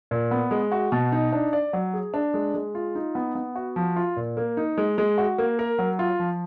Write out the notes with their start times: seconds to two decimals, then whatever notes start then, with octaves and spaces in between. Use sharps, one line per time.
0.11 A#2
0.31 B3
0.51 G#3
0.72 F#4
0.92 B2
1.12 D#4
1.33 D4
1.53 D5
1.73 F#3
1.94 G#4
2.14 D4
2.34 G#3
2.54 G#3
2.75 F4
2.95 D#4
3.15 B3
3.35 B3
3.56 F#4
3.76 F3
3.96 F4
4.17 A#2
4.37 A#3
4.57 D#4
4.78 G#3
4.98 G#3
5.18 F#4
5.38 A#3
5.59 A#4
5.79 F#3
5.99 F4
6.19 F3